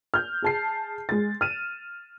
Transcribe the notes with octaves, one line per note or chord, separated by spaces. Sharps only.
F6 G6
G#4 A5 C7
G#3 A6
F6 D#7 E7